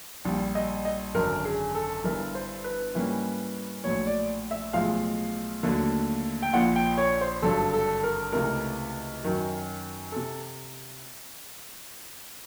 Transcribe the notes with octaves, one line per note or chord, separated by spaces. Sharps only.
A#1 A#2 G3
D#5
D#5
G#1 F#2 D3 A#4
G#4
A4
G1 G2 E3 A#4
C5
B4
G#2 E3 G3 A#3 C#4
A#1 A2 F#3 C#5
D5
E5
B1 A2 F3 G#3 F5
D#2 D3 F#3 A3
G5
A#1 A#2 F3 F#5
G5
C#5
C5
G#1 G2 D3 F#3 A4
A4
A#4
C#2 C3 E3 A3 A#4
F#2 D#3 F#3
C3 A4